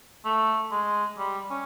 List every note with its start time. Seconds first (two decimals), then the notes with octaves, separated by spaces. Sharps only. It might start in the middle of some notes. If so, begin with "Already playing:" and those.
0.25 A3
0.71 G#3
1.18 G3
1.50 C#4